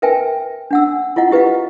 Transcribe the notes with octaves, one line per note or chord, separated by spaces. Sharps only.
A#4 B4 E5 G5 G#5
D4 F#5 E6
E4 F4 D#5 F#5
E4 G4 B4 D#5 F5